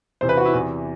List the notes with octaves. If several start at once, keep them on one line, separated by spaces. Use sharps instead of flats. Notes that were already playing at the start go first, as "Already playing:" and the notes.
E2 C3 E3 C5
B4
F#4
E4
E2 C3 E3